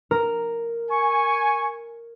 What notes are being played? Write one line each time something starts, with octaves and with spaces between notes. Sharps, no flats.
A#4
G#5 C#6